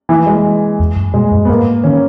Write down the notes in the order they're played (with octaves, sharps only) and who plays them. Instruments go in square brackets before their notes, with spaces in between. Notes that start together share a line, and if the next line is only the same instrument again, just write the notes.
[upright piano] E3
G#3
[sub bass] E2
F#2
[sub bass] A#2 [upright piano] G#3
[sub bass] F#2
[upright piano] B3
[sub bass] G#2 [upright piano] A#3
[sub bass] D#3 [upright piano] C#4